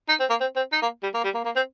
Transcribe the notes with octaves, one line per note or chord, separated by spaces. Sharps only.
D#4
C4
A#3
C4
C4
D#4
A#3
G3
A#3
G3
A#3
A#3
C4